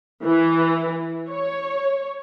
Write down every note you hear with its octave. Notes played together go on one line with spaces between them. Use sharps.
E3
C#5